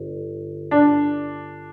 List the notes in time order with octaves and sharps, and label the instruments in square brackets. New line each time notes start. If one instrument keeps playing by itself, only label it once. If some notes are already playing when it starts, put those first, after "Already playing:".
Already playing: [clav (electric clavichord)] G1
[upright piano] D4